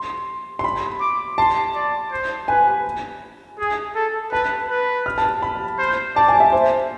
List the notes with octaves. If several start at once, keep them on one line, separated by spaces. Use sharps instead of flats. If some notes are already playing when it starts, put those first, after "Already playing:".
Already playing: C6
C6
B5
D6
A5 C6
D5
C5
B4 G#5
G#4
A4
B4 A5
B4
F6
A5
B5
C5
D5 A5
G#5
E5
C5